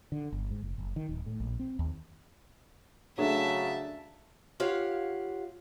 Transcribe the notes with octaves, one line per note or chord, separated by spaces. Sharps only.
D3
G1
G#2
F#1
F#1
D#3
D1
A2
A#1
C4
D#2
C#3 F#3 A3 D4 G#4 E5 A5
F4 G4 C#5 F5 F#5